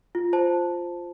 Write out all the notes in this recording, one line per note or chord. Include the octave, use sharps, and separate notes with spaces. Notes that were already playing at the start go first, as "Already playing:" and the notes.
F4
C5 A5